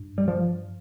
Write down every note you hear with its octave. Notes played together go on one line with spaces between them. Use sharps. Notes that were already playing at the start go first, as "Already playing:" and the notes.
Already playing: G2
G3
F3